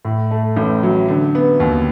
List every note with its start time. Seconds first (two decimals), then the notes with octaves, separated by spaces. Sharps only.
0.05 A2
0.31 A3
0.57 A1
0.83 F#3
1.08 D3
1.35 B3
1.60 D#2